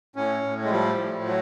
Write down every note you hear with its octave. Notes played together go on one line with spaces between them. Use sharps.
A2 C#4
A2
G#3
F3 G3
A2
F#3